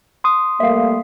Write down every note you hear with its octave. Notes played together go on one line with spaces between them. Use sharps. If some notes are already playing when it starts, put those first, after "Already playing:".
C6 D#6
G3 A3 A#3 E5 F5